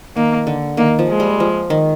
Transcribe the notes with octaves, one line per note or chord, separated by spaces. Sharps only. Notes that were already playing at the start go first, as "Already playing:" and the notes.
D#3 A#3
D3
D#3 A#3
F3
G#3
G3
F3
D#3